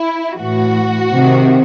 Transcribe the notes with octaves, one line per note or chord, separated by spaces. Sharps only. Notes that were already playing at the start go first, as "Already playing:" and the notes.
Already playing: E4
A2 E3 F#4
C3 D#3